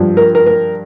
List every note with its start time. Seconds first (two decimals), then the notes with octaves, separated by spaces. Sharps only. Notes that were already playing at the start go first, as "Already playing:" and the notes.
Already playing: G2 F3
0.17 A#4
0.35 A#4
0.47 A#4